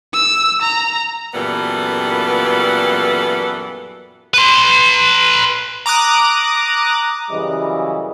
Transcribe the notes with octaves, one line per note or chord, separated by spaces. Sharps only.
E6
A#5
F#2 A#2 E3 G3 B3 A4
B4 C6
A#5 D6 D#6 F#6
F#2 C#3 E3 G3 E4 D#5